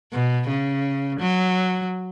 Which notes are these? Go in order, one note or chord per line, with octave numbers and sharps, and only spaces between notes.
B2
C#3
F#3